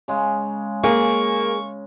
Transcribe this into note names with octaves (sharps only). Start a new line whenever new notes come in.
C#3 G#3
A#3 G#4 C#6